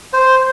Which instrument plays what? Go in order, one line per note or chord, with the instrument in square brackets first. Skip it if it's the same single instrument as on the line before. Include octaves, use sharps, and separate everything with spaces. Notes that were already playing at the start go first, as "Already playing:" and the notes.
[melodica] C5